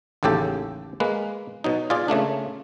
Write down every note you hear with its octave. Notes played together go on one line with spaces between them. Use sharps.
A1 D#2 C#3 G4 A4
G#3 A#3 B4
B2 F#3 D#4
F4 G#4 D5
C#3 A3 A#3 D4